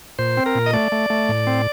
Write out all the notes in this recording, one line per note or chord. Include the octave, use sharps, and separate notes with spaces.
A#2 C5
C4
A#4
A#2
D#5
A3 D5
A3
A3
A2
C4